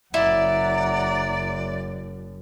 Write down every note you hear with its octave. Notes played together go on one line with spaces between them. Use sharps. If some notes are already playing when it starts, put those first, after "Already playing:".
F#1 F#2 E4 D5 F#5 A#5